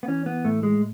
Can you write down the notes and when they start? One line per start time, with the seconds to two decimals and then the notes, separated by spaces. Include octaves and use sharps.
0.03 B3
0.08 E3 C#4
0.26 B3
0.45 A2 A3
0.63 G#3